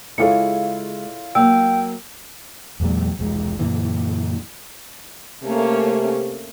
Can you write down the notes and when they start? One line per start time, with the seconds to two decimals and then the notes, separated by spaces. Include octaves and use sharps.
0.18 C#3 G#3 E4 F4 G#4 A4 C#5 C#7
1.35 F#3 A#3 G5 E6
2.80 E2 A#2 F#3 G#3
3.19 E1 C2 F3 G#3
3.59 F#2 A#2 D3 E3
5.43 C3 A3 A#3 C#4